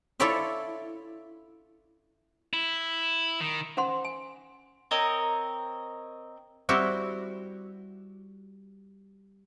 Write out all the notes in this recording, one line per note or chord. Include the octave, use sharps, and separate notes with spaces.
E4 F4 A4 C#5 D5 E5
E4
D#3
C#4 C5 F#5 C6
G#5
C4 A#4 C#5 D#5
G3 C4 E4 F#4